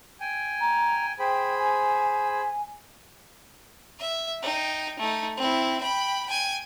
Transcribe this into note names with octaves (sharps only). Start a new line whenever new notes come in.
G5 G#5
A#5
G#4 C5 G5 B5
G#5
E5
D#4 G5
A3 D#4
C4 E4
G5 B5
G5 G#5